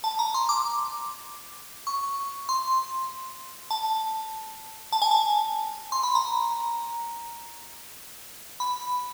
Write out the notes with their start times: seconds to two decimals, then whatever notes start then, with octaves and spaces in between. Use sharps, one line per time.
0.04 A5
0.19 A#5
0.34 C6
0.49 D6
1.87 C#6
2.49 C6
3.71 A5
4.92 A5
5.02 G#5
5.11 A5
5.92 C6
6.03 B5
6.15 A#5
8.60 B5